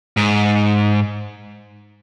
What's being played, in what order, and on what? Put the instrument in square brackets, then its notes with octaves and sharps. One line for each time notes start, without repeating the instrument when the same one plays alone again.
[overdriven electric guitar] G#2